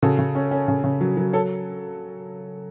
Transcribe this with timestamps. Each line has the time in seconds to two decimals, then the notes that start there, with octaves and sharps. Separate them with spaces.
0.03 C#3 F#4 A4
0.19 C#3
0.35 C#4
0.51 C#4
0.68 C#3
0.84 C#3
1.01 F#3
1.17 F#3
1.33 A4 C#5